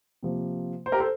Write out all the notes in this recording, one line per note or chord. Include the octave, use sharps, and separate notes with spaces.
C3 F3 A#3
C5
G4 A#4
A4 C5